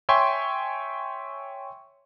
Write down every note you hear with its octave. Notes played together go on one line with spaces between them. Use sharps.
C#5 E5 G5 G#5 C6 C#6